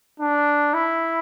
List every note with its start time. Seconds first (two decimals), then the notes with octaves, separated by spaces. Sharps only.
0.20 D4
0.74 E4